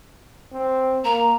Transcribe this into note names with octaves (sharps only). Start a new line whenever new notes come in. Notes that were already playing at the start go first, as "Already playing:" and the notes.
C4
A#3 A#5